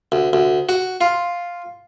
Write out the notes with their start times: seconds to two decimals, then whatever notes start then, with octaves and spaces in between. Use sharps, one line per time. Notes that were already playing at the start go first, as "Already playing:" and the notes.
0.12 D2
0.33 D2
0.69 F#4
1.01 F4